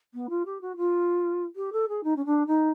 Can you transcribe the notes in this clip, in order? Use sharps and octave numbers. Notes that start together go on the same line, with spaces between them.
B3
F4
G4
F#4
F4
G4
A4
G#4
D#4
C#4
D4
D#4